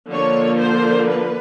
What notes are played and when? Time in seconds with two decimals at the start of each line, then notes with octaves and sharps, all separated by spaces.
0.11 D3 F3 A#3 C#5
0.59 C5
1.06 B4